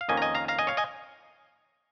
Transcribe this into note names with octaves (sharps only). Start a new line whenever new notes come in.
F5
F2 D#3 A#3 C#4 D#5 G#5
A#5
D#5 G#5
F5 A#5
F5 A#5
D#5 G#5
C#5 F5
D#5 G#5